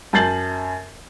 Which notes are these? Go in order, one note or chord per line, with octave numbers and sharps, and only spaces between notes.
F#2 A5 G6 A6 C7 F#7